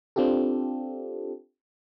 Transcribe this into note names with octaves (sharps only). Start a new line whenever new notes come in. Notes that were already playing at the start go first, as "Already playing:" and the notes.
C4 D4 F4 G4 A4